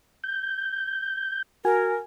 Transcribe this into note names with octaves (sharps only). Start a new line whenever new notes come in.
G6
F#4 A#4 G#5